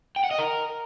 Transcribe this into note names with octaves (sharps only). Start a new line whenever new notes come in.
G5
F#5
D#5
A#4